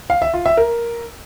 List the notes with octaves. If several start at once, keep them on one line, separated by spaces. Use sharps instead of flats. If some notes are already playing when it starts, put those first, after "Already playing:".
F5
E5
F4
E5
A#4